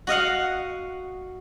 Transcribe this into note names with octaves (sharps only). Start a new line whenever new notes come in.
F#4 D#5 F5 F#5